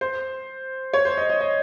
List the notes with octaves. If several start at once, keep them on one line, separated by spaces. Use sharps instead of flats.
C5
C#5
C5
D#5
D#5
D#5